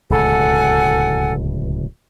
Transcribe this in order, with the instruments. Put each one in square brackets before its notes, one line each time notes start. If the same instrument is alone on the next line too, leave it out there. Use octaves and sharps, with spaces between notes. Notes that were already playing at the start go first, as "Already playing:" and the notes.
[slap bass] D1 C#2 B2 [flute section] A4 F#5 G#5